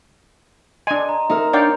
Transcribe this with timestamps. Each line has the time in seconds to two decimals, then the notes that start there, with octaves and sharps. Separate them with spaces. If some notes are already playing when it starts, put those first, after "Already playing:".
0.87 D4 D#5 G#5 C6
1.09 A#5
1.30 D#4 A#4 E5
1.53 D4 C#5 D5 F5 G5